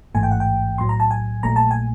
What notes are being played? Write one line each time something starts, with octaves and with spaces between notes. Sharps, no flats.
A1 G#2 E3 A3 G#5
G5
F#5
G5
B1 A2 F#3 C6
A#5
A5
G#5
A#1 A#2 F#3 A3 A#5
A5
G#5